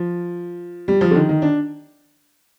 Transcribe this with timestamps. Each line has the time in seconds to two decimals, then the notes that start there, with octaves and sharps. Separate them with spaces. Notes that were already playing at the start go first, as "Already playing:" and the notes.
Already playing: F3
0.88 G3
1.01 F3
1.11 D3
1.15 D#3
1.29 D#3
1.42 D4